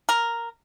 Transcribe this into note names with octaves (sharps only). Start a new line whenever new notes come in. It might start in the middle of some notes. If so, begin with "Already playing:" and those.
A#4